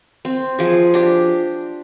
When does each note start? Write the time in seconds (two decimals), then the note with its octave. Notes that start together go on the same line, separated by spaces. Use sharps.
0.25 C4
0.59 F3 G#4
0.94 D4 G4